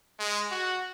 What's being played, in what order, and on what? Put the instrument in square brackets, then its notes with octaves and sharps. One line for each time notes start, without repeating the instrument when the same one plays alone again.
[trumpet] G#3
F#4